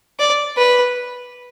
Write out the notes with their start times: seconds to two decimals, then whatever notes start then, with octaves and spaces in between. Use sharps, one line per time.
0.19 D5
0.57 B4